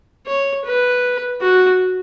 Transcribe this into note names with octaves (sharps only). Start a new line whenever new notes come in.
C#5
B4
F#4